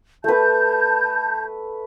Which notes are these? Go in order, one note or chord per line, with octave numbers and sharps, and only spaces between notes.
A3 B4 A5 G6